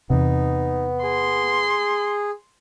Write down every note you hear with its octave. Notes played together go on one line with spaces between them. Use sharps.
E2 C3 B3 D#4
G#4 C6